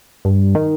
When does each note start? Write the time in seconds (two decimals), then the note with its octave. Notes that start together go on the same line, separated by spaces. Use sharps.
0.25 G2
0.55 D#3